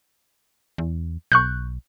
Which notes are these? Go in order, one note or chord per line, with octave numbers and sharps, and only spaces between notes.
E2
B1 C#6 F#6 G6